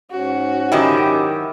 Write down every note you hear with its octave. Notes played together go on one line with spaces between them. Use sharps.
G#2 C#4 F#4
F#2 D#3 E4 G4